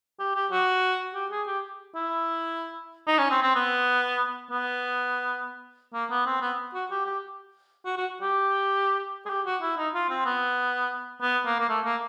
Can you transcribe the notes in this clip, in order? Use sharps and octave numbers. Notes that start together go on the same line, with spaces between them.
G4
G4
F#4
G4
G#4
G4
E4
D#4
C#4
C4
C4
B3
B3
A#3
B3
C4
B3
F#4
G4
G4
F#4
F#4
G4
G#4
G4
F#4
E4
D#4
F4
C4
B3
B3
A#3
A#3
A3
A#3